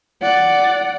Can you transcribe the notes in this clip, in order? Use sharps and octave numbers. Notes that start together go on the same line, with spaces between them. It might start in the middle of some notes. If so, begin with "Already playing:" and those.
D5 F#5